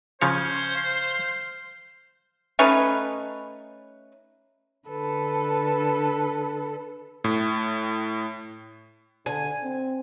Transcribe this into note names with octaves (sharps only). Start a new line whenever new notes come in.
C#3 F3 C#4 C5 C#5
F5
A3 C#4 D#4 B4
D3 A4 B4
A2
D3 G#5
C4